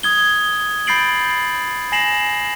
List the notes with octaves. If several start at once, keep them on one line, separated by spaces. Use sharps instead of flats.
D#6 G#6 G7
B5 G6 A6 C7 D7 F#7
G#5 A#6 C7 E7 F#7